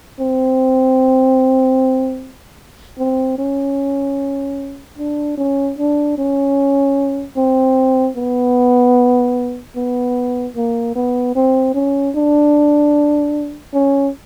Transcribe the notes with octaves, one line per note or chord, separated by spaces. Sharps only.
C4
C4
C#4
D4
C#4
D4
C#4
C4
B3
B3
A#3
B3
C4
C#4
D4
C#4